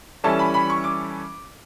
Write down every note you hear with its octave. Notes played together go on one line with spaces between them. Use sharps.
E3 G3 C#4 E4 A4 A5
B5
B5
C#6
D6